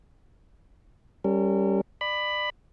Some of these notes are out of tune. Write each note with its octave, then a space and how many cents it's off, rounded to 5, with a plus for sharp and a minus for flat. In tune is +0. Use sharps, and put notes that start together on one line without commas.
G3 +0 C#4 +0 A#4 -40
D5 +30 B5 +10